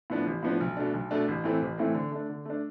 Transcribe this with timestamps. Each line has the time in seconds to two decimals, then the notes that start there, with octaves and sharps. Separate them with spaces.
0.10 A2 F3 B3 D4
0.26 A1
0.43 A2 F3 B3 D4
0.61 B1
0.77 B2 A3 D4
0.94 B1
1.11 B2 A3 D4
1.28 A1
1.44 A2 E3 A3 C4
1.62 A1
1.78 A2 E3 A3 C4
1.95 D3
2.11 A3 D4
2.29 D3
2.45 A3 D4